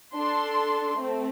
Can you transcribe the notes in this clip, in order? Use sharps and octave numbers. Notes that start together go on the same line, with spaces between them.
D4 A4 C6
A3 C4